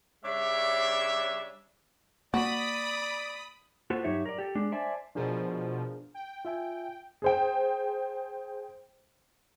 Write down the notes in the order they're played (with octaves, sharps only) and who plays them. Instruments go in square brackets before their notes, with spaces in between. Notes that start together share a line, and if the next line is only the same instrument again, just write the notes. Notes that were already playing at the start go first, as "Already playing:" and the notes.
[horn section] C#3 G3 D4 C#5 E5
[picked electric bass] A#3 [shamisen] F#4 [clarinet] D5 [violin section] B5 D#6
[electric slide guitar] A#3 F4 F#4 A4 B4 C5
G2 F#3 D#4 G4 C#5 E5
A#4 D5
G4 A4
G#3 D4
C5 D5 E5 G#5 A5
[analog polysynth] B2 F3 [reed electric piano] D4 G#4 A#4
[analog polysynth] G5
[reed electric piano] F4 E5 G#5
[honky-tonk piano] G#4 C5 G5